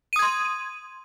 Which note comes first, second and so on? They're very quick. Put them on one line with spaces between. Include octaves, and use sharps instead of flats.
D#7 D#6 G#6 C6